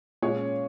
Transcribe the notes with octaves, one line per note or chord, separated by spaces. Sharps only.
A#2 G#3 C#4 G#4 C#5